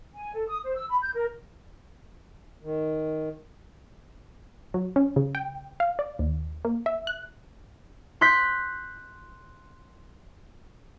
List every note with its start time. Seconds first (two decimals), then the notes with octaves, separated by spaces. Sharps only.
0.15 G#5
0.34 A4
0.47 D#6
0.64 C5
0.75 E6
0.90 B5
1.02 G6
1.14 A#4
2.63 D#3
4.74 F#3
4.96 C#4
5.16 C#3
5.35 G5
5.80 F5
5.99 D5
6.19 D#2
6.65 A#3
6.86 E5
7.07 F#6
8.21 C6 F#6 G6 B6